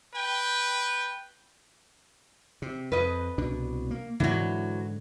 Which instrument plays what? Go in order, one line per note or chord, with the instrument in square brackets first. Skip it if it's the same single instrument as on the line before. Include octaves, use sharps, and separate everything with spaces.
[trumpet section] B4 G5
[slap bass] C3
[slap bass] F2 [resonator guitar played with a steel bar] B4 D#5
[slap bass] C2 B2 D4
A#3
[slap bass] G#2 D3 [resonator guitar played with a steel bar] E3 F#3